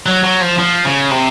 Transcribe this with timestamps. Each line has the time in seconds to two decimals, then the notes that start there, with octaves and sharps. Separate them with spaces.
0.06 F#3
0.24 F#3
0.41 F3
0.59 F3
0.85 C#3
1.11 C3